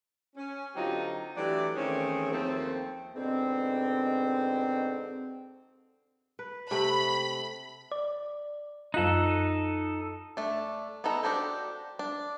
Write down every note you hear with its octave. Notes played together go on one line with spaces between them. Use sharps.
C#4
D3 F#3 C4 D#4 F4 G4
E3 F#3 A3 D4 G4 D5
D#3 E3 A3 C4 C#4 G#4
D#2 F3 A3 C4
G#2 B2 D3 C4
B4
C3 A3 B5
D5
F#2 D#4 F4 A4 F#6
A3 D4
B3 D#4 A4 A#5
D4 F#4 G4 A4 C5
D4